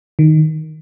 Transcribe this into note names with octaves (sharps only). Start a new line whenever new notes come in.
D#3